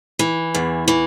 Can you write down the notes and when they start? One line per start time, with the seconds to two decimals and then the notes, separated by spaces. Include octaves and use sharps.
0.19 E3
0.55 E2
0.88 E3